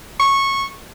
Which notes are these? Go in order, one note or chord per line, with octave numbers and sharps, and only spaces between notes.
C#6